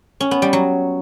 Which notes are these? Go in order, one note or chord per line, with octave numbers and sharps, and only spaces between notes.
C#4
B3
G3
F#3